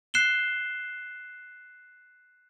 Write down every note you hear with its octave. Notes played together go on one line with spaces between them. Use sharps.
F#6 C7 E7 G7